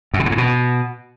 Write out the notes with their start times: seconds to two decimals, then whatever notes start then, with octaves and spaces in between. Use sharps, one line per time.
0.14 F#2
0.20 C#3
0.26 A2
0.32 G#2
0.38 B2